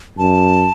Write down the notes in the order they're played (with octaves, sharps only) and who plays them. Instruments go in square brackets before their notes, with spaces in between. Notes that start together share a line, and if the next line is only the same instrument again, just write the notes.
[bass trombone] F#2 [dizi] A5